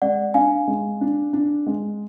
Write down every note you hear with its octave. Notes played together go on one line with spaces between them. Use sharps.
G#3 D5 F#5
D4 F5 G#5
G#3
D4
D4
G#3